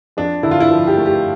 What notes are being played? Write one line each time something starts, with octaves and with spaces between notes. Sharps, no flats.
F2 D4
D3 E4
F4
E4
F3
G4
A3
G4